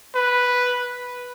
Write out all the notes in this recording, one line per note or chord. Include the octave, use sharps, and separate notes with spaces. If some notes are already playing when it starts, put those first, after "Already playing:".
B4